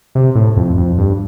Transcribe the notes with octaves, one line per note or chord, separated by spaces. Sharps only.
C3
A2
F2
F2
G2